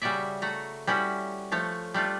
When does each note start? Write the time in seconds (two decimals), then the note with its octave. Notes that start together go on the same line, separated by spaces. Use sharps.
0.02 C#3 G3 F#4 C#5 D5 E5
0.42 A3 F#4 A#5
0.87 G3 C#4 E4 F#4
1.52 F3 A3 C#5
1.94 G3 A3 D4 F4